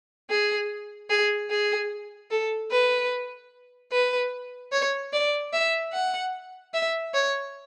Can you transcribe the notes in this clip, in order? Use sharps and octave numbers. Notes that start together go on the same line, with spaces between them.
G#4
G#4
G#4
A4
B4
B4
C#5
D5
E5
F#5
E5
C#5